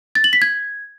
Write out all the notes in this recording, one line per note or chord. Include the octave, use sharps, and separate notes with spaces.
A6
F#7
B6
G#6